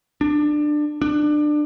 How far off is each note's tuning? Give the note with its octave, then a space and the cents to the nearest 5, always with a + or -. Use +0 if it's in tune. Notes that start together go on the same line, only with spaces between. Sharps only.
D4 +20
D4 +25